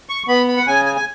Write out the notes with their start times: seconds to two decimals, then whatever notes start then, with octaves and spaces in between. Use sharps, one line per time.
0.09 C#6
0.28 B3 B5
0.48 B5
0.57 F#5
0.66 C#3 G#5
0.86 G#5
0.96 G#5